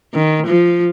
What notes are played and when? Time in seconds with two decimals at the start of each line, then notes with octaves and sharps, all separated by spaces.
0.14 D#3
0.47 F3